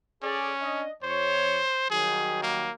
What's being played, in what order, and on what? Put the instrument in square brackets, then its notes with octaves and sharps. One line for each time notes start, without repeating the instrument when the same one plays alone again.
[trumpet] C#4 [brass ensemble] G#4 A4 D5
[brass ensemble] D4 D#5
[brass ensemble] F2 C#5 [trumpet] C5
[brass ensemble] D#3 F#3 G3 [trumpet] G#4
[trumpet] A#3